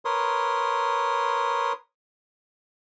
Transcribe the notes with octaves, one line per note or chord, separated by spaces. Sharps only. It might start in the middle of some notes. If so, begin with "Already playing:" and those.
A#4 B4 C#5 C6 D#6